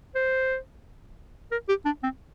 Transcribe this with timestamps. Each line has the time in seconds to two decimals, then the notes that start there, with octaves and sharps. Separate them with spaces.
0.15 C5
1.51 A#4
1.68 G4
1.85 D4
2.03 C4